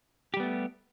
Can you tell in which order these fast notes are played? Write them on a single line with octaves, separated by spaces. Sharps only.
G4 G3 B3 A3